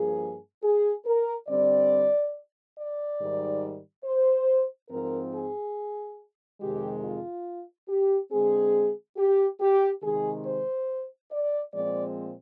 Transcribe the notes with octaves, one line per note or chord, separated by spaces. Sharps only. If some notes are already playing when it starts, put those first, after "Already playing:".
Already playing: G2 F3 A#3 G#4
G#4
A#4
D3 G3 C4 D5
D5
G#2 D#3 G3
C5
G#2 F3 C4 A#4
G#4
F2 C3 D#3 G#3 G4
F4
G4
D3 G#3 C4 G#4
G4
G4
C3 D#3 G#3 G#4
C5
D5
A#2 F3 G#3 C4 D5